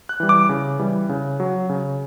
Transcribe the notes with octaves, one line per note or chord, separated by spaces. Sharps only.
F#6
E3 G3
D6
C#3
E3 G3
C#3
F#3
C#3